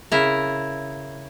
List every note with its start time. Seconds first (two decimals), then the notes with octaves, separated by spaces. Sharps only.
0.12 C#3 E4 A#4